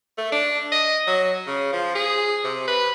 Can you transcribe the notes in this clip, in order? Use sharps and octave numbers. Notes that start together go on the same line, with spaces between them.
A3
D4
D#5
F#3
C#3
F3
G#4
C3
B4